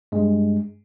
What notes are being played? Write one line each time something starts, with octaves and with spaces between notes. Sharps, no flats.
G2 G#3